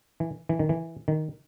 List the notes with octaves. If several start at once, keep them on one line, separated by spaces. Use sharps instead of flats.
E3
E3
D#3
E3
D#3